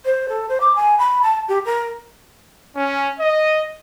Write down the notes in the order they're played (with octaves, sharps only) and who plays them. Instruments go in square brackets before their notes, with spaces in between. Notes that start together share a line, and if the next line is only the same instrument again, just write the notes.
[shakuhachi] C5
A4
C5
D6
G#5
B5
A5
G4
A#4
[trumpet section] C#4
D#5